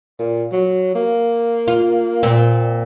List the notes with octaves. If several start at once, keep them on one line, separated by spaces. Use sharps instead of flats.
A#2
F#3
A#3
F4
A#2 C4